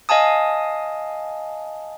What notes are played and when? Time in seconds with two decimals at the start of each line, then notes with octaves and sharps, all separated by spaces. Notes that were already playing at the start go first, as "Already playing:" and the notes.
0.09 D#5 F5 G#5 A5 D#6